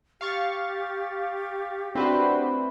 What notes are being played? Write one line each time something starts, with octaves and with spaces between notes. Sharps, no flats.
G4 F5 C#6 A6
A3 C4 D4 E4 F#4 B4 C5 G5